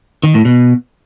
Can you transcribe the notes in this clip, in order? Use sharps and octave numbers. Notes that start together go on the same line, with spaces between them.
D#3
A2
B2